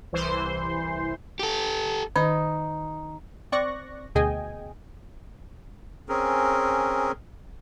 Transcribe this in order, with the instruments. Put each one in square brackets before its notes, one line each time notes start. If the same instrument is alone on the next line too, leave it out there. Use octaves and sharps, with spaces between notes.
[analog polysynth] C2 E3 C5 C6
[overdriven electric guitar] G4 A4
[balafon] D#3 [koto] D#4
[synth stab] C4 D5 C#6 F#6 A#6
D2 B2 G#4 D#5 G5 G#5
[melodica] C4 C#4 G#4 A#4